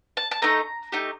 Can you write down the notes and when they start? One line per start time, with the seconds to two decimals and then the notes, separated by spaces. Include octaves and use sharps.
0.17 A5
0.31 A5
0.42 A3 D#4 A4 A#5
0.92 A3 D#4 G4